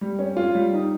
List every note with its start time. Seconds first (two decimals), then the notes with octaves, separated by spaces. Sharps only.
0.01 G3
0.19 C#4
0.37 F4
0.55 G3
0.74 D#4